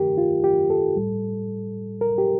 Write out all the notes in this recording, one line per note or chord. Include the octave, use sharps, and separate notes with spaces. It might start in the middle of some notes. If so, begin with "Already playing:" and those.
Already playing: G2 D#3 A3 G4 A#4
F4
G4
A4
A2 G3
A#4
G4